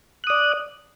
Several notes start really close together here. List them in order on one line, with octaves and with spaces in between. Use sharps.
F#6 D#6 D5